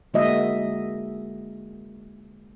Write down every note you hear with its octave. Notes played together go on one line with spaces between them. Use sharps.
D3 G#3 A#3 F#4 D#5 E5